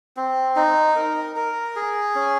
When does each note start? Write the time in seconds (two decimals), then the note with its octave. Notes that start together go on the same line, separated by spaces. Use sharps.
0.17 C4
0.56 D#4
0.96 A#4
1.36 A#4
1.76 G#4
2.15 C#4